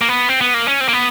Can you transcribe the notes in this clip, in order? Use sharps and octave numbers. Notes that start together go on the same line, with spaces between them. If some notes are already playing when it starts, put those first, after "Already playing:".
A#3
B3
C4
B3
A#3
C#4
C4
A#3
B3